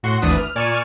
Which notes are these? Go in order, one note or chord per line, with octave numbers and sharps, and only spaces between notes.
A2 F#4 C6 C#7
G#1 D2 E3 D4 B4 D#6
F6
A#2 D5 G#5 C#6 F6 E7